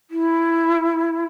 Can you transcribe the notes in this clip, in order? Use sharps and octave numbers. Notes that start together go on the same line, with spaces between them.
E4